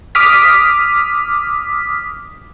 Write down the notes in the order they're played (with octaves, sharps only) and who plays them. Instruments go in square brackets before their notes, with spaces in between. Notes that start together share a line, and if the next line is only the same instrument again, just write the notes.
[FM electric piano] D6 D#6 F6 B6